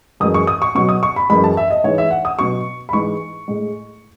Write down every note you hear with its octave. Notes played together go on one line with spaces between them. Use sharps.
F#2 E3 G#3 D#6
C#6
D#6
C#6
B2 F#3 C#6
D#6
C#6
B5
F#2 E3 G#3 B5
A5
E5
D#5
G#2 E3 G#3 C#5
E5
F#5
D#6
B2 F#3 C#6
B5
G#2 E3 G#3 C#6
A2 G#3